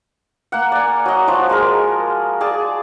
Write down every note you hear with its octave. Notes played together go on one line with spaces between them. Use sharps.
A#3 F#5
D5 G#5
F#3 D#5
F3 F#4 D5
G#3 G#4 A#4
G#4 D5 A5